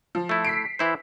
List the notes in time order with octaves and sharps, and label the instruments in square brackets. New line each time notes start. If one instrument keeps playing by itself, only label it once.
[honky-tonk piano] F3
[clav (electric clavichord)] A3 E4
[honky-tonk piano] B6 C7 D7
[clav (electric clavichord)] E3 E4 C5